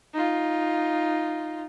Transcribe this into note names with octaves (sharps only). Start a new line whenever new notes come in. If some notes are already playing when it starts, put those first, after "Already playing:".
D#4 F4